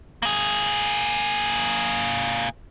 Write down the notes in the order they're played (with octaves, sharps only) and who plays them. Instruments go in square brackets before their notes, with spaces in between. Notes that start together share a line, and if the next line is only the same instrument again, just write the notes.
[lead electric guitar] A#3 G#4